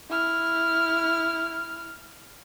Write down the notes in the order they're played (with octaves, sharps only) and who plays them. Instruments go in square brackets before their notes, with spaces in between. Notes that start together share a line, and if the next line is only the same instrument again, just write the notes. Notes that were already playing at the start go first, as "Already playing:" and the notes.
[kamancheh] E4 F6